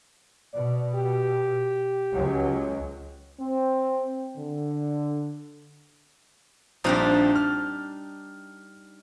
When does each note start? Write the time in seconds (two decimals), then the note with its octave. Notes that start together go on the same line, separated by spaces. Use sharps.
0.53 B2 D5
0.95 G4
2.13 C#2 F#3
3.39 C4
4.37 D3
6.84 A#1 F3 G3 C4 D4 D#4
7.36 F6